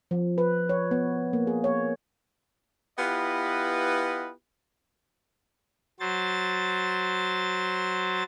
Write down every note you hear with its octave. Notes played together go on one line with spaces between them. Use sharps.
F3
B4
C#5
B3
A#3
G#4
C#5
B3 E4 F4 G4 B4 D#5
F#3 C5 A6